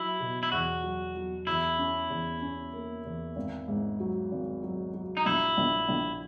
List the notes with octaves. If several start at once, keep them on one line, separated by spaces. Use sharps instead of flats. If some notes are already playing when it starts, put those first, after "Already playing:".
Already playing: F#3 E4
B2
E4
E2 F#4
F#3
F#3
E2 E4
C#4
E2
C#4
A#3
E2
G#1
G#2
F#3
G#1
F#3
F#3
D#4
A#1 E4
A#1
A#1